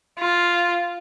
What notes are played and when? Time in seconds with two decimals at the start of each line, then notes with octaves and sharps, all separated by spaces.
0.19 F4